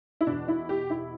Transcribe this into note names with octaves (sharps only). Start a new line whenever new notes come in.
E4
E2 B2 D4
E4
G4
E4